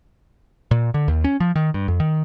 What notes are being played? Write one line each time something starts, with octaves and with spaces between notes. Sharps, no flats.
A#2
D3
D#2
C#4
F3
D#3
G2
F2
D#3